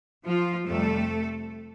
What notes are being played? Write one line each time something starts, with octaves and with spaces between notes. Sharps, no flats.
F3 F4
F2 C3 G3 A3 A4